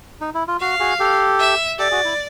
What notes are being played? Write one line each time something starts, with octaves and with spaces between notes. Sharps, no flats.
D#4
E4
F4
F#4 F5
F#4 G#4
G4 A4
E5
G4 A4 D5
F#4 G#4
E4